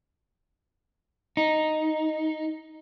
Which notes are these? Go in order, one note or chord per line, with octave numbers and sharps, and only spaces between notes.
D#4